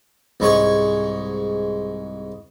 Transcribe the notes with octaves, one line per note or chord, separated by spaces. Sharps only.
C2 G#2 G#3 G#4 C#5 C#6